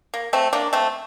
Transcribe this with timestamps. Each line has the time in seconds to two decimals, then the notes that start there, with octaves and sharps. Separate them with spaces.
0.14 A#3
0.33 A3 C4
0.53 A#3 D4
0.73 A3 C4